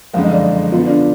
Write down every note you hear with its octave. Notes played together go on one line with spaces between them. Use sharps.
F#1 F2 D3 G#3 F5
D#5
D5
D3 F3 B3 F4
D4